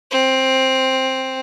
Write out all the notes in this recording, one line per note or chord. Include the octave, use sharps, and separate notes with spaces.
C4